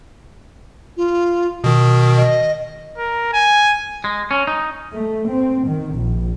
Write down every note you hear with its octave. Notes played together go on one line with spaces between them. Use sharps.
F4
B2 D#3 D#6
D#5
A#4
G#5
G#3
C#4
D#4
A3
C4
D#3
A#1